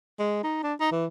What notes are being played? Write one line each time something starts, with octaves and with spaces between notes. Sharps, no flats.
G#3
D#4
D4
D#4
E3